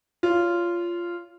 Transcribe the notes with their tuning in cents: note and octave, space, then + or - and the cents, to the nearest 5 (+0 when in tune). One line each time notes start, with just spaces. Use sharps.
F4 -10 C#5 +30